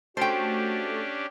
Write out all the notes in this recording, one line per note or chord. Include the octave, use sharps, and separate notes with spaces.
A3 C#4 D4 F#4 G4 C5 G5